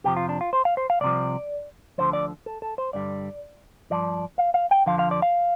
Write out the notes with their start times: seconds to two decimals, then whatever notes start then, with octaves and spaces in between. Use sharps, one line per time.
0.04 F2 C3 F3 G4
0.17 F4
0.29 D4
0.41 F4
0.53 C5
0.65 F5
0.77 C5
0.90 F5
1.01 C2 C3 F3 D5
1.98 D2 D3 F3 C5
2.13 D5
2.46 A4
2.62 A4
2.78 C5
2.93 G2 D3 G3 D5
3.90 G2 F3 D5
4.38 F5
4.54 F5
4.71 G5
4.86 F2 D3 F3 F5
4.99 F5
5.11 D5
5.22 F5